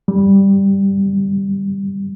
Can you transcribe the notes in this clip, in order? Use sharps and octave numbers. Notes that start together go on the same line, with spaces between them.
G3